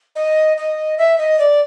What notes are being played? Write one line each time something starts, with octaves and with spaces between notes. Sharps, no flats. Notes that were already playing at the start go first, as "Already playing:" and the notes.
D#5
D#5
E5
D#5
D5